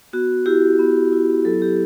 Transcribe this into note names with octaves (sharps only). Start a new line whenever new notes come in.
B3 F#4
E4 G4
B3
E4
F#3 A4
G4